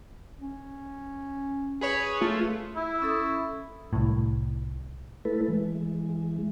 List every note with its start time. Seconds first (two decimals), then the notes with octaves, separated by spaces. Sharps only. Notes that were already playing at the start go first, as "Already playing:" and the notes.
0.40 C#4
1.81 G#4 B4 C#5
2.21 A3 F4
2.76 E4
3.02 C#4 A4 D#6
3.93 C2 A2
5.25 A3 E4 A4 B4
5.48 E3 G#3